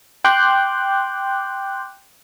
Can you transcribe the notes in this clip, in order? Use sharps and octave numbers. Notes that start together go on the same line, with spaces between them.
G5 C6 D6 F#6 G6